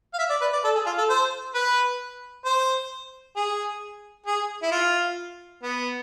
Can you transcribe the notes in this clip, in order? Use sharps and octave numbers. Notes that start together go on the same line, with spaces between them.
F5
E5
D5
B4
D5
A4
G#4
F4
A4
C5
B4
C5
G#4
G#4
E4
F4
B3